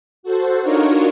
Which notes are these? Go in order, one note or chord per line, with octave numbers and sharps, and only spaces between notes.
F#4 A4 C5
D4 D#4 F4 F#4 A#4 C#5